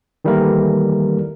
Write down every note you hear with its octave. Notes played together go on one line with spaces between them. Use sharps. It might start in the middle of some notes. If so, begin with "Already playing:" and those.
D#3 E3 G3 A3 A#3 A#4